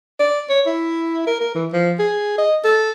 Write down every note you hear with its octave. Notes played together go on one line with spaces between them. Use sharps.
D5
C#5
E4
A#4
A#4
E3
F3
G#4
D#5
A4